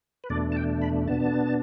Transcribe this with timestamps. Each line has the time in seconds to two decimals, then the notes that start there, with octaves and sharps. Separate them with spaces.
0.24 B4
0.30 E2 B2 A3 D4 D5
0.52 A5
0.56 G5
0.82 B5
1.07 B2 B3 D4 A5